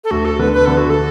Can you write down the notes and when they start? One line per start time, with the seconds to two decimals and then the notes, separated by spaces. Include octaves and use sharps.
0.04 A4
0.11 D2 F#4
0.25 A4
0.39 D3 B4
0.53 B4
0.66 D3 A4
0.77 F#4
0.90 A4